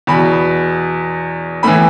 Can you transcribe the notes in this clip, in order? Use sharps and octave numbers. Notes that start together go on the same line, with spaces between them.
E2 B2 B5
A2 E3 B5